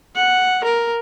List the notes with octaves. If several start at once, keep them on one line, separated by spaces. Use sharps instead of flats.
F#5
A#4